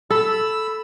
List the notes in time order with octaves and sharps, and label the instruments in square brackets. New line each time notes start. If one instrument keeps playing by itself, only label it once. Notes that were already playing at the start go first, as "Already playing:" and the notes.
[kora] A4 [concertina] B5 E6